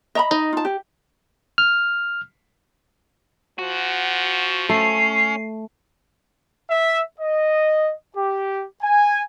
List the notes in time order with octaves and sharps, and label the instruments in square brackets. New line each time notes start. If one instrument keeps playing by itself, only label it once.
[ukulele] D#5 A#5 B5
[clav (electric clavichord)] D#4 [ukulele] D#5
[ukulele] F4 A5
G4
[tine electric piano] F6
[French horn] F3 [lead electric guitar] F#4
[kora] A3 [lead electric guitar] C#4 [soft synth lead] C7
[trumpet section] E5
D#5
G4
G#5